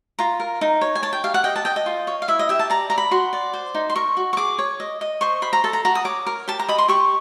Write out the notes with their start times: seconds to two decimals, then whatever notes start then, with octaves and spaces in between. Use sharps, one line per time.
0.19 F4 A#5
0.40 A#4
0.61 D#4
0.81 C#5
0.95 G#5
1.03 C#5 A5
1.13 G5
1.24 G4 F5
1.34 F#5
1.44 D#5 G5
1.56 A5
1.65 D#5 G5
1.76 D#5
1.86 F4
2.07 C#5
2.22 F5
2.28 E4 E5
2.39 D#5
2.49 G4 E5
2.59 A5
2.70 D5 A#5
2.90 D5 A#5
2.98 B5
3.11 F#4 C6
3.33 D5
3.53 C5
3.75 D#4
3.90 C6
3.96 A#4 C#6
4.17 F#4
4.33 C#6
4.37 G#4 D6
4.58 C#5
4.80 D#5
5.01 D#5
5.21 C5 C#6
5.42 C5 B5
5.53 A#5
5.64 A4 A5
5.73 A#5
5.85 F#4 A#5
5.95 D#6
6.04 C#5 D6
6.26 A#4
6.48 G4 A5
6.59 A#5
6.68 D#5 B5
6.78 C6
6.88 G4 C#6